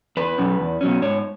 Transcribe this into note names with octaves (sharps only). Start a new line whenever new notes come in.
E2 B4
B2 F#3 C#4
E2
B2 F#3 C#4
G#2 C#5